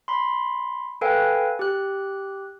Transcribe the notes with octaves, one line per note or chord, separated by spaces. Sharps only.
B5 C6
A4 B4 F5 G5 G#5
G4 F#6